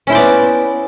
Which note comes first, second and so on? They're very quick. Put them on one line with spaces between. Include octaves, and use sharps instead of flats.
C#4 E4 C5 D5 B3